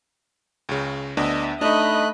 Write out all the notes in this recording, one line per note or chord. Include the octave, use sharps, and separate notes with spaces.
C#2 C#3
D2 B3 D4 D#5 E5
A3 D4 D#4 D#5 B5 F#6